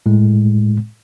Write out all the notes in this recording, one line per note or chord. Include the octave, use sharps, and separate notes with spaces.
A2 G#3